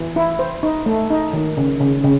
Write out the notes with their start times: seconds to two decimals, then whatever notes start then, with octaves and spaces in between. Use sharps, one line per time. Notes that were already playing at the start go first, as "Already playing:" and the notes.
Already playing: E3
0.16 E4
0.39 C5
0.63 D#4
0.86 A3
1.11 D#4
1.33 D#3
1.57 C#3
1.81 C#3
2.04 C#3